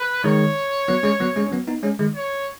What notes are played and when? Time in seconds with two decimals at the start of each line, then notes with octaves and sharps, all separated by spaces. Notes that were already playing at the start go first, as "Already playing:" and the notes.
Already playing: B4
0.24 D#3 G#3 C#5
0.88 F#3 B3
1.03 G#3 C#4
1.20 F#3 B3
1.36 G#3 C#4
1.46 C#4
1.52 F#3 B3
1.67 B3 D#4
1.83 G#3 C#4
1.99 D#3 G#3
2.15 C#5